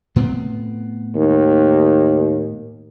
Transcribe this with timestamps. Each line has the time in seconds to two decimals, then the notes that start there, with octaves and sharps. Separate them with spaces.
0.16 A2 B3 C4
1.15 D#2